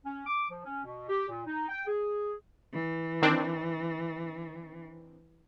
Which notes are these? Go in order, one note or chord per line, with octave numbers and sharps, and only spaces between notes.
C#4
D6
F3
C#4
B2
G4
A#2
D#4
G5
G#4
E3
D#3 C4 D4